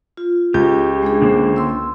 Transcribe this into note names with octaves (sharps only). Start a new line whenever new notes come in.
F4
C#2 G4 G6
G#3 D4 G#4
D3 A#3 C5
C6 E6